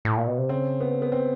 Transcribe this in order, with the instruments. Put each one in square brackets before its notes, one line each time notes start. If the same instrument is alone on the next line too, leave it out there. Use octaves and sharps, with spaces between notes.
[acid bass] A2
A#2
B2
C3
[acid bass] C#3 [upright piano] C4
[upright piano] B3
B3
C4